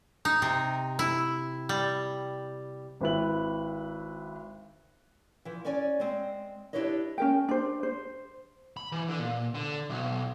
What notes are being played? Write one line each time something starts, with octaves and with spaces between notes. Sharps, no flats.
D#4
C3
E4
G3
G#1 C4 E4 B4 E5 F#7
E3 F3
C#4 C#5 D5 G#5
G#3 C4
D4 E4 G4 B4 C#5 D#5
C#4 A#4 G5
D4 C5
C5
B5
E3
D3
A#2
D3
B1